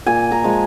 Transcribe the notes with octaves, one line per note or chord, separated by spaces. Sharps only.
A#2 G#5
A#5
F3 G#3